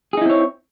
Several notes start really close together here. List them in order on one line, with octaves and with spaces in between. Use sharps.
G#4 D#4 E4 C4 C#5